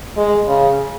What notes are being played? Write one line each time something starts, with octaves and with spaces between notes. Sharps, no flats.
G#3
C#3